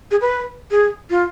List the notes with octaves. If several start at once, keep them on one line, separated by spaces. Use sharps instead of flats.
G#4
B4
G#4
F4